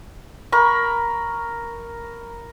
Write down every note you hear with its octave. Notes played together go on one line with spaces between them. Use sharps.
A#4 B5 C#6